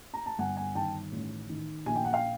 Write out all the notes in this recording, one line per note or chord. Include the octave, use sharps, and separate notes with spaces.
A#5
A5
G1 F#5 G#5
F#5 G#5
D#3 G5 A5
A1
D#3
A#1 G#5
G5
F#5
F5 G5